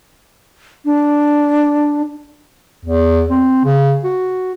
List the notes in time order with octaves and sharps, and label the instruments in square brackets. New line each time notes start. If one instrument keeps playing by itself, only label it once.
[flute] D4
[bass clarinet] E2
C4
C#3
F#4